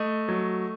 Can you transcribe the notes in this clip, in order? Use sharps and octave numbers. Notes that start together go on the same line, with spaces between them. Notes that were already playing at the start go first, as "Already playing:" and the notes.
Already playing: A3 D#5
F#3